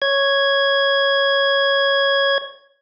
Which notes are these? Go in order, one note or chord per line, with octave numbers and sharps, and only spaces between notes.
C#5 G#6